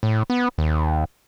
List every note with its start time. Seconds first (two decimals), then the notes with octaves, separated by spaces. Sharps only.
0.03 A2
0.30 B3
0.58 D#2